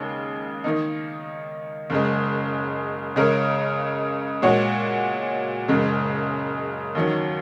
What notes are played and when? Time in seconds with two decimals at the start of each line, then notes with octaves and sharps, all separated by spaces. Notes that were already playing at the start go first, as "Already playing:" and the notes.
Already playing: D#2 C#3 G#3 C#4
0.64 D#3 A#3 D#4
1.90 F#1 F#2 C#3 G#3
3.16 C#2 C#3 G#3 C#4 A#4
4.42 A#2 G#3 F#4 C#5
5.68 F#1 F#2 C#3 G#3
6.95 D#2 D#3 F#3 C#4